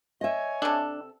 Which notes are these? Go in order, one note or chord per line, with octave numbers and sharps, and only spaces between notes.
C#5 D#5 E5 G#5
C3 D4 A4